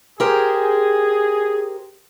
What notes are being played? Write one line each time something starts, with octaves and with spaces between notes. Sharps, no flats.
G4 G#4 A#4 C5